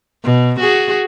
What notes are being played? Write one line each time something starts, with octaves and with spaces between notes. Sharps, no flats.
B2
F#4 G#4